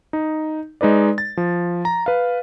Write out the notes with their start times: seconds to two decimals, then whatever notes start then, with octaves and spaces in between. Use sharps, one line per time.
0.13 D#4
0.81 G#3 D#4 B4 D5
1.18 A6
1.37 F3
1.85 A#5
2.06 B4 F5